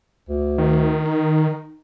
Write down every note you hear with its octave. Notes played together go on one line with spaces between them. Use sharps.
D2
D#3
D#4